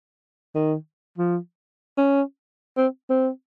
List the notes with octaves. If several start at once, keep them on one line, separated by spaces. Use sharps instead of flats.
D#3
F3
C#4
C4
C4